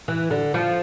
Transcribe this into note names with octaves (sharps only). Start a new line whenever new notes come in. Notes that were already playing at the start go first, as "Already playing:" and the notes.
E3
D3
F3